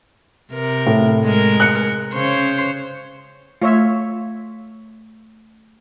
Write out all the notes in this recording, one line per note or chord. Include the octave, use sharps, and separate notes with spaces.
C3 A#4
A2
G#3 A#4
F#6 C#7
C#3 C5 C#5
A3 F4 C#5 E5